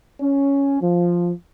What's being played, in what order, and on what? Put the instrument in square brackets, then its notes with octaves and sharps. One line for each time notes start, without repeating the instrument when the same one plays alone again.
[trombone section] C#4
F3